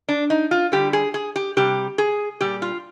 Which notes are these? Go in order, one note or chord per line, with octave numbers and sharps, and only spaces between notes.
D4
D#4
F4
D3 G3 G4
G#4
G#4
G4
C3 G3 G4
G#4
A#2 G3 G4
F4